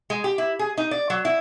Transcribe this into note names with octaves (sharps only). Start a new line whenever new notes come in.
G#3
G4
E4
G#4
D#4
D5
F#3
E4